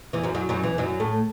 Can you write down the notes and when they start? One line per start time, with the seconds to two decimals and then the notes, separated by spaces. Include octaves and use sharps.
0.13 E2 E3
0.23 F#2 F#3
0.35 F#2 F#3
0.49 F#2 F#3
0.63 E2 E3
0.78 F#2 F#3
1.00 A2 A3